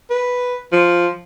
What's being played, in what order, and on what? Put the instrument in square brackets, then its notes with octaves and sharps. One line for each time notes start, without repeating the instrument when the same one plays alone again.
[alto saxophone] B4
F3